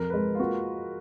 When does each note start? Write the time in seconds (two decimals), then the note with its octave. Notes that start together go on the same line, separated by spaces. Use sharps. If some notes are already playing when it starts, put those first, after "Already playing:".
Already playing: F2 A#4
0.10 B4
0.14 G#3 A#4
0.35 F4
0.39 A#3 F#4